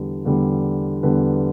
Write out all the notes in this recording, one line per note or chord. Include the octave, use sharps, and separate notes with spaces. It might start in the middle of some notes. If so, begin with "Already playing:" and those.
Already playing: E2 D3 G3
E2 D3 G3
E2 D3 G3 B4